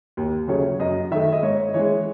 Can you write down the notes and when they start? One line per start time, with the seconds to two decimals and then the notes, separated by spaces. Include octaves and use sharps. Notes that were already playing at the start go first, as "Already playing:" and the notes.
0.17 D#2
0.48 C#3 F#3 A3 C#5
0.80 F#2 D#5
1.11 D#3 A3 E5
1.32 D#5
1.43 G#2 C#5
1.74 E3 G#3 C#5